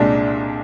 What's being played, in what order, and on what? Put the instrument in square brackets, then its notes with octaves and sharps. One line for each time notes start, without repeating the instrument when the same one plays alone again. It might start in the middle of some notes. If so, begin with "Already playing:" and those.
Already playing: [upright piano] C2 A#2 G#3 D4